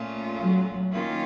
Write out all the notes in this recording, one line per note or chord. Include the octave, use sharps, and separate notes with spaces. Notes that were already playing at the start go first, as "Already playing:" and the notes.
Already playing: A#2 A3 C#4 F4
F#3
D#3 A#3 C#4 F4